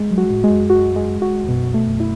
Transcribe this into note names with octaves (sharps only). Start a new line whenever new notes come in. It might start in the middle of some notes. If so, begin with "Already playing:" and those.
Already playing: G#3
F#3
F#4
A2
G#3
F#2
F#4
G#3
F#4
E2
F#2 B2
A3
F#2
E4